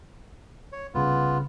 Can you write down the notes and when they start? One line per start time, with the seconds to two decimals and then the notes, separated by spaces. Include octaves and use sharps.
0.72 C#5
0.95 C2 C#3 B3 F4